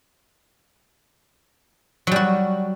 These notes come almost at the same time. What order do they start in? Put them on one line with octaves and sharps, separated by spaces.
F#3 G3 F#4